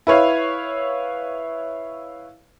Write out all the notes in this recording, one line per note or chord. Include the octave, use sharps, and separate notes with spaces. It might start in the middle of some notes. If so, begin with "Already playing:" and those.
E4 B4 C#5 F5